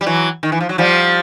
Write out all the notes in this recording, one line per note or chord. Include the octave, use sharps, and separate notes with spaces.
G3
E3 F#3
D#3
E3
F3
F#3
F3 G3